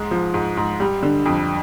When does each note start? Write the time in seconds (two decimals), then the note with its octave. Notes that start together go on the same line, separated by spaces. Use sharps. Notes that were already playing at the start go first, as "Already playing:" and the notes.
Already playing: G#2 G#3
0.11 F3
0.34 G#2
0.57 G#2
0.80 G3
1.03 D3
1.26 F2